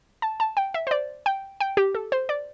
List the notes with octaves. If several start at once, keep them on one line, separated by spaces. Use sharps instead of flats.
A5
A5
G5
E5
C5
D5
G5
G5
G4
A4
C5
D5